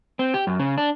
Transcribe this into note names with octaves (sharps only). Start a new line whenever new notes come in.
C4
G4
F#2
C#3
D4